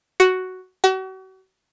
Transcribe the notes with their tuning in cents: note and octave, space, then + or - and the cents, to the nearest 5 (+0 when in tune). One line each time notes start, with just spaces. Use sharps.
F#4 +5
F#4 +40